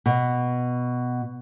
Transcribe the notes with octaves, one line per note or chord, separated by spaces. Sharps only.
B2